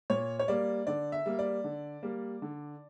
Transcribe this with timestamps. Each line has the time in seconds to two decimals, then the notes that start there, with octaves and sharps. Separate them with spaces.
0.10 A#2 C#5
0.39 C#5
0.48 G3 A#3 D5
0.87 D3 D5
1.12 E5
1.26 G3 A#3
1.39 D5
1.64 D3
2.03 G3 A#3
2.42 D3